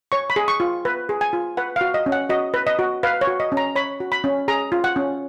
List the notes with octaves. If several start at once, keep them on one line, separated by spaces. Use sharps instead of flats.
C#5 C#6
B5
G#4
C#6
F4
B4
G#4
G#5
F4
B4 F#5
F5
F#4
D#5
C#4
F#5
F#4 D#5
B4
D#5
F#4
B4 F5
C#5
F#4
D#5
C#4
A#5
C#5 B5
F#4
B5
C#4
G#4 A#5
F4
F#5
C#4